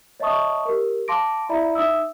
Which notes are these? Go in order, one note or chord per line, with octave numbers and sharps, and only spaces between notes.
C#5 D#5 E5 A5 C#6 D#6
G4 A#4
F5 A5 C6 D6 A#6 D7
E4 D5 E5 A#5 B5
D#4 E5 D#6 E6